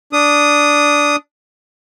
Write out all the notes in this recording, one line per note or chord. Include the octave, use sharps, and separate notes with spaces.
D4 D#6